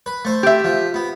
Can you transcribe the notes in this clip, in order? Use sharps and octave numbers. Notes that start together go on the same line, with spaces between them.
B4
A3 C5
G4 E5
F3
B3